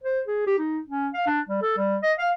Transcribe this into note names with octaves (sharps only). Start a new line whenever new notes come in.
C5
G#4
G4
D#4
C#4
F5
D4
G3
A4
G3
D#5
F5